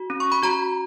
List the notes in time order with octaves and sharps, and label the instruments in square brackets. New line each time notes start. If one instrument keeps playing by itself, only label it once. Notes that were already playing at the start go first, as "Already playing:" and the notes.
Already playing: [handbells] F#4
C#4
C#6
B5
F#4 A#5